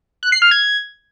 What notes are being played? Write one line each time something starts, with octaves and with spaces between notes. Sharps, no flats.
F#6
C7
F6
G#6